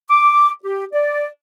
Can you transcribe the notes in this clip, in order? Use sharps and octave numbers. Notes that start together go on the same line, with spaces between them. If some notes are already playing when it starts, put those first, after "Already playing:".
D6
G4
D5